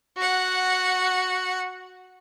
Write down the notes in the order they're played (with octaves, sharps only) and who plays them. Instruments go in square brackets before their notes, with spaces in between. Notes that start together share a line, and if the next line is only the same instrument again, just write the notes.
[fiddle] F#4 F#5